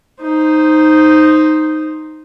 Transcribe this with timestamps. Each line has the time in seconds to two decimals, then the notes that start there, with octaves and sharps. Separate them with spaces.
0.22 D#4 C5